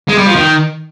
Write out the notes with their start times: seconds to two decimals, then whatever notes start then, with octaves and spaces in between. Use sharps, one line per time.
0.08 G#3
0.18 G3
0.26 F3
0.36 D#3